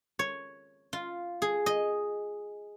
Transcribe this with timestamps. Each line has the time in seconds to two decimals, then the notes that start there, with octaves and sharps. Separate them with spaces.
0.19 C#5
0.93 F4
1.42 G#4
1.66 D#5